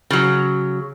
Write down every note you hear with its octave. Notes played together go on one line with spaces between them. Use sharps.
C#3 F#3